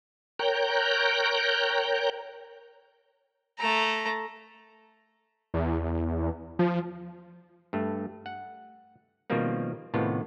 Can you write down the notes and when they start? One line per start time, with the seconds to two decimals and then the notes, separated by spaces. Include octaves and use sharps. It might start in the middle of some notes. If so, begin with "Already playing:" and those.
0.39 A#4 C#5 G5 A#5 F#6 G6
3.59 A3 A#5
5.54 E2
6.59 F3
7.73 G2 A3
8.26 F#5
9.30 B2 D#3 F3 G3 A#3 C4
9.94 A2 C3 D#3 B3 F4